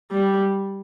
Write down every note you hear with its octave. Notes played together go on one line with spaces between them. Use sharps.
G3